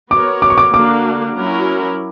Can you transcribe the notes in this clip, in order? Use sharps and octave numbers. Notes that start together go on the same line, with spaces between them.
B3 F#4 A#4 C#5 D6
D6
C#6
D6
D3 A#3 D4 F#4 D6
F#3 C#4 E4 A#4